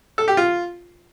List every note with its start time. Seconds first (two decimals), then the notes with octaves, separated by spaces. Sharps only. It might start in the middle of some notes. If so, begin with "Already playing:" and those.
0.18 A4
0.28 G4
0.37 F4